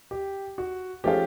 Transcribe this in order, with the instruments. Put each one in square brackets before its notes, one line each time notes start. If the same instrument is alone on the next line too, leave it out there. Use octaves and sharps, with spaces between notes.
[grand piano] G4
F#4
[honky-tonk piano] F3 A3 C#4 F4 G#4 [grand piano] G4